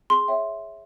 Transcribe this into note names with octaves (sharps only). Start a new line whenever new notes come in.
G#4 C6
C#5 E5 G5